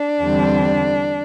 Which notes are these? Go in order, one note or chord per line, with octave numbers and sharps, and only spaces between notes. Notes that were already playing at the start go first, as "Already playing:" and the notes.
Already playing: D4
E2 D3 G3 C4